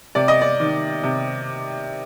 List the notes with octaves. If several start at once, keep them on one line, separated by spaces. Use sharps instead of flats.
C3 D5
D#5
D5
D#3
C3